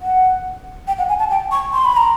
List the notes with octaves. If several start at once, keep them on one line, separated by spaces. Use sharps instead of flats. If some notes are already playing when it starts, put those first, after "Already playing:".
F#5
G5
F#5
G#5
A5
G5
C#6
C6
B5
A#5